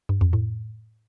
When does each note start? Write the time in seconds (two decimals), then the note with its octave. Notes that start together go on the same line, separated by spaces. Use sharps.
0.09 G2
0.21 F2
0.33 A2